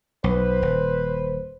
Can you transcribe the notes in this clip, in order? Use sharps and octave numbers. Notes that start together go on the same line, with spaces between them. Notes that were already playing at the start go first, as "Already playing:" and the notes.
B1 B4 C5
D#1